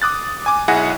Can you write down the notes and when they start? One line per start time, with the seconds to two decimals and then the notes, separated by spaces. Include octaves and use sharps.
0.02 D6 D#6 F#6 A6
0.46 G#5 D6
0.68 B1 E4 G#4 F#5 G#5 A#6